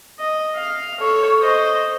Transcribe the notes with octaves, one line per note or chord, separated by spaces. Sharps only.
D#5
F5
A4 C#5
C5 D#5